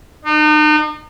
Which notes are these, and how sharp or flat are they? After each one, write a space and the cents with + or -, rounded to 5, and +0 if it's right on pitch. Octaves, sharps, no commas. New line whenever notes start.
D#4 -40